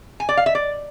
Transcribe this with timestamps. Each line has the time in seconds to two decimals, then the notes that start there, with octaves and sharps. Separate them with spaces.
0.20 G#5
0.29 D5
0.37 F5
0.46 E5
0.55 D5